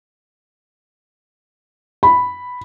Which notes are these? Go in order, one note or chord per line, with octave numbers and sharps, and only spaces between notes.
B5